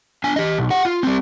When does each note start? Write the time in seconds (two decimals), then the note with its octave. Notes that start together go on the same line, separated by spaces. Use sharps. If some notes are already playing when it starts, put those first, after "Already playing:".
0.24 D4 G#5
0.36 G4 D#5
0.59 B1
0.70 G4 F#5
0.85 F4
1.03 G3 C4